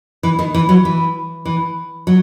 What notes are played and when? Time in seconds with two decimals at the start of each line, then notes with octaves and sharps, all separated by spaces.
0.23 E3
0.39 D#3
0.54 E3
0.69 F#3
0.85 E3
1.45 E3
2.07 F#3